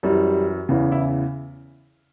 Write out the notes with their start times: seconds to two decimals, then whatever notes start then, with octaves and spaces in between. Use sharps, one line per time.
0.03 F#2 E3 G3
0.69 E2 C#3 E3
0.92 E4